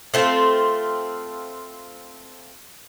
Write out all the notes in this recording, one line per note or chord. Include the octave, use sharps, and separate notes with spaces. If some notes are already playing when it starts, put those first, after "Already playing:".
A3 C4 F4